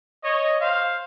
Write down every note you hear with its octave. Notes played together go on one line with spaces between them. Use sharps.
C#5 D#5
C5 F5